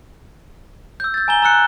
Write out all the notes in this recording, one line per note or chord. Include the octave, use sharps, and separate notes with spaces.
E6 G6
G6 A6
G#5 A#5 G7
A#5 E6 F#6 C#7